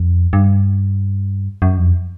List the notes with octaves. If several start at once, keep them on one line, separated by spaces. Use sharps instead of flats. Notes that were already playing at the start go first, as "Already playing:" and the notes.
Already playing: F2
G2
F#2
F2